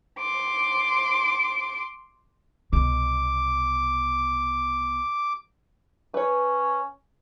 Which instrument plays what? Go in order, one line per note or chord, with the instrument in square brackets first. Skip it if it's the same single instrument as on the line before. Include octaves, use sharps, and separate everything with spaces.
[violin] C6 D6
[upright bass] C2 B2 [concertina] D6
[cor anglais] C#4 [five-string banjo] B4 C#5